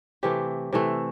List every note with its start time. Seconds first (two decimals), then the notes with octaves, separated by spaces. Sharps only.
0.23 C3 E3 A3 G4
0.73 C3 E3 A3